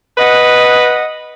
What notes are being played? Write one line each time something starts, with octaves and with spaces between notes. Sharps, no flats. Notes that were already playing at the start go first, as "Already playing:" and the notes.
B4 D#5 F#5